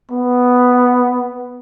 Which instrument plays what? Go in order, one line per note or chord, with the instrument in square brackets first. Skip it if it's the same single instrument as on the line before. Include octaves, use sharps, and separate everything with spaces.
[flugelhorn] B3